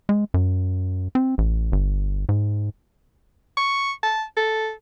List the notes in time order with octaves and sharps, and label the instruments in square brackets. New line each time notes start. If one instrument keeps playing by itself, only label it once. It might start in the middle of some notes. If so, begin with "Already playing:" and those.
[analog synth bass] G#3
F#2
C4
A1
G1
G#2
[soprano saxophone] C#6
A5
A4